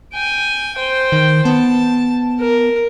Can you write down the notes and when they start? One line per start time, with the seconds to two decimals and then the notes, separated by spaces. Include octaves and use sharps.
0.13 G5 G#5
0.76 C5 G5
1.12 D#3
1.45 B3 A5
2.39 A#4